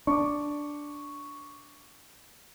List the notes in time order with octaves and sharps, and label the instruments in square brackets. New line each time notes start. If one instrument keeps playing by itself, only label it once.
[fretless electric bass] D4 [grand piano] C#6 D6